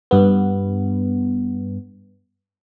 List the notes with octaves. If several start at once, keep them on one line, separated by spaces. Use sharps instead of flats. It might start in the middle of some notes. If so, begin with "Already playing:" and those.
G2 B3